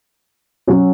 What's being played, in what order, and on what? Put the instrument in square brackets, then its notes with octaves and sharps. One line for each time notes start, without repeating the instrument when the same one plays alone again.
[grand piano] F#3 C#4 F#4